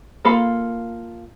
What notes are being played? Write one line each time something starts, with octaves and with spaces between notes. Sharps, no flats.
A#3 F4 A4 F5 B5